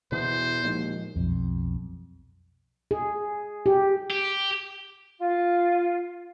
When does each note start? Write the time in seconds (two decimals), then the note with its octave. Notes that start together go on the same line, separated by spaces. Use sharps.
0.12 E2 B2 E3 C5
0.64 D#2 A#2 F3 G#3
1.16 B1 F2
2.91 G#4
3.66 G4
4.10 G4
5.18 F4